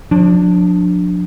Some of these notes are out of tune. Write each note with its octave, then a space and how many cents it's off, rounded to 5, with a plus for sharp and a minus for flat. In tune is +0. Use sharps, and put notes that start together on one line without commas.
F3 +45 D4 +0